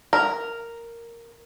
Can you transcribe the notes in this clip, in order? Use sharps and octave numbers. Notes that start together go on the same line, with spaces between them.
A#4